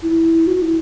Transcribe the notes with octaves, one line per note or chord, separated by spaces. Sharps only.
E4
F#4
E4